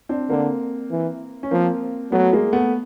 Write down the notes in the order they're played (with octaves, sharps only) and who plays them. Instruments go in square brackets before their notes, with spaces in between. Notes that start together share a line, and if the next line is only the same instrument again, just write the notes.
[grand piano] C4 D4
[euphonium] D3 [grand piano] A#3 C4
[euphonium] E3
[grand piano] C#4
[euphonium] F3 [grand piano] A#3 C4
[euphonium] F#3 [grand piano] A3 B3
[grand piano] G#3 A#3
A3 B3